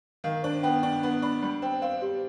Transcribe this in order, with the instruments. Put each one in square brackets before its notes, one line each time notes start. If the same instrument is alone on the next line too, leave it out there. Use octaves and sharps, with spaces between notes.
[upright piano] D#3 [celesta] F5
[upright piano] D4 [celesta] C5
[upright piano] B3 [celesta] G5
[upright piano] D4 [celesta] G5
[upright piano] B3 [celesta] B5
[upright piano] D4 [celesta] B5
[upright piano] G3 [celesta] B5
[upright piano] C4 [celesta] G5
[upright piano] C4 [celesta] F5
[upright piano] C4 [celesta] G4